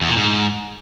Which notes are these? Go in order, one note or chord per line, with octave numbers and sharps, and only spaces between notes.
E2
A#2
G#2